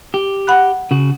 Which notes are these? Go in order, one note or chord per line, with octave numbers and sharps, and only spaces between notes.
G4
F#5 B5 F#6
C#3 F#4